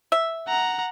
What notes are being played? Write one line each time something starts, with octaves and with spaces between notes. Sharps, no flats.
E5
F#5 A#5